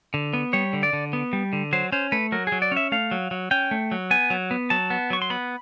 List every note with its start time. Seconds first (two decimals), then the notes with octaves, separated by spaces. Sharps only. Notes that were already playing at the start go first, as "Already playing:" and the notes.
0.14 D3
0.33 B3
0.53 G3 C#5
0.73 D3
0.83 D5
0.93 D3
1.13 B3
1.33 G3
1.53 D3
1.73 F#3 C5
1.92 C#4 C5
2.12 A3 B4
2.32 F#3 A#4
2.47 F#3 G#4
2.62 D5
2.72 C#4 E5
2.92 A3 F5
3.11 F#3
3.31 F#3
3.51 C#4 G5
3.71 A3
3.92 F#3
4.11 B3 G#5
4.30 F#3
4.51 B3
4.70 F#3 A5
4.90 B3
5.10 F#3 C#6
5.22 C6
5.30 B3 B5